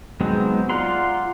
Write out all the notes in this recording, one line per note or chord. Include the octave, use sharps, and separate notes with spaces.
F#3 G#3 B3 C4 D#4
F4 D5 F#5 A#5 C6